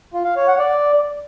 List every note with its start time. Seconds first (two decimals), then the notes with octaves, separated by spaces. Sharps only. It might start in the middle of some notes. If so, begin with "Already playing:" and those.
0.13 F4
0.25 F5
0.36 C#5
0.48 F#5
0.59 D5